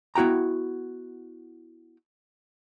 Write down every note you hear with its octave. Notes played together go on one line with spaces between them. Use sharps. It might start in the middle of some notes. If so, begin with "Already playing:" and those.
B3 E4 F#4 G5 A#5